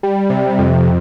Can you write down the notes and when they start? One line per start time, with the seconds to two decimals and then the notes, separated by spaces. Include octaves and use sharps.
0.03 G3
0.30 C3
0.58 F2